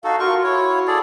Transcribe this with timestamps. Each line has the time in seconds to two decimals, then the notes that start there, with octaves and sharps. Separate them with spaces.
0.04 D#4 F#4 A4 F5
0.20 F4 F#4 A#4 C#6
0.44 E4 C#5
0.87 G#4 A4 D5